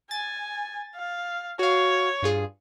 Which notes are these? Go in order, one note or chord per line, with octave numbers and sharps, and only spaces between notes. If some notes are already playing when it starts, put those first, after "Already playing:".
G#5 A6
F5
F#4 C#5 F5
G2 F4 G#4